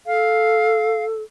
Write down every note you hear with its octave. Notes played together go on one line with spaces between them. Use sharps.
A4 F5